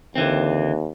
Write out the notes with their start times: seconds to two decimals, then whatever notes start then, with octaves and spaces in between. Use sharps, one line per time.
0.15 D#2 D3 E3 C4